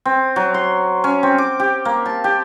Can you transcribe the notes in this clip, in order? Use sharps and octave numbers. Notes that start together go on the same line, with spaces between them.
C4
F#3
C6
C#4
C4
D6
G4
A#3
A5
G4